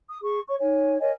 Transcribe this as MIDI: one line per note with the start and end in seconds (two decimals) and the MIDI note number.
0.10 0.19 87
0.23 0.40 68
0.23 0.40 85
0.48 0.55 73
0.48 0.55 85
0.59 0.97 63
0.59 0.97 73
0.59 0.97 80
1.00 1.10 70
1.00 1.10 73
1.00 1.10 75
1.00 1.10 80